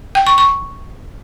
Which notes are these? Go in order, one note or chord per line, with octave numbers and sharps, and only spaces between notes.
G5
C#6
C#6